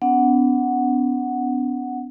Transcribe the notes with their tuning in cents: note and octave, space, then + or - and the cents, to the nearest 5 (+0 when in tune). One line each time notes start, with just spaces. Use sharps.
B3 +35 D4 -30 F#5 +0